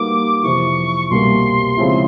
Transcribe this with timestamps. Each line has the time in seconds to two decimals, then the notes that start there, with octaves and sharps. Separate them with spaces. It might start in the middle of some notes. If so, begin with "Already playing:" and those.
Already playing: G3 A#3 D#4 F#4 B4 D6
0.43 F2 C3 E3 C#6
1.10 C2 B2 G3 A#3 C6
1.77 C#3 F3 G#3 C4 E4